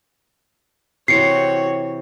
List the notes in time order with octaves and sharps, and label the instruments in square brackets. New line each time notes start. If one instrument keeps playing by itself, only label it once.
[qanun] C3 E3 C4 [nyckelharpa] F#4 C#5 [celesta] C7 C#7